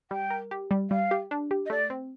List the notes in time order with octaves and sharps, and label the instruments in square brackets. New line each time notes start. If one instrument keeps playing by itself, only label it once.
[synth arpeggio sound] G3 [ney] G5
[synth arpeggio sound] A#4
G4
G3
[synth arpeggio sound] G3 [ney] F5
[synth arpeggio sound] G4
D4
G4
[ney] D#5
[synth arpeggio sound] A3 [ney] D5
[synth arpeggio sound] C4